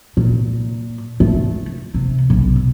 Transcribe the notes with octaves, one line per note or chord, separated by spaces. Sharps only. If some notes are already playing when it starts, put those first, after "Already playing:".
A#2
A3
C3
B1